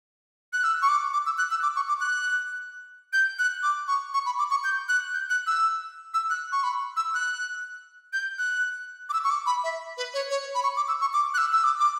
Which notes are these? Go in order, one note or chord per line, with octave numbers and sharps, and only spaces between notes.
F#6
E6
C#6
D6
D6
E6
F#6
E6
D6
C#6
D6
F#6
G6
F#6
D6
C#6
C#6
B5
D6
C#6
G6
F#6
G6
F#6
E6
E6
F#6
C#6
B5
E6
F#6
G6
F#6
D6
E6
C#6
D6
B5
E5
B4
C#5
C#5
B5
C#6
D6
E6
C#6
D6
F#6
E6
E6
D6
D6